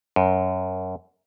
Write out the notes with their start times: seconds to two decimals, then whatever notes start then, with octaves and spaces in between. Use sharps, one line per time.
0.16 F#2